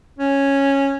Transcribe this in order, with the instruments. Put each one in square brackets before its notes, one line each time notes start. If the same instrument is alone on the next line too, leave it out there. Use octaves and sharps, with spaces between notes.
[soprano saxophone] C#4